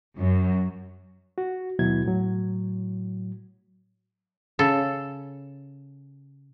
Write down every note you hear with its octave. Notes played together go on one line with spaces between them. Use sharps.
F#2
F#4
D#2 B2 F#3 E4 G#6
A2 F#3
C#3 A4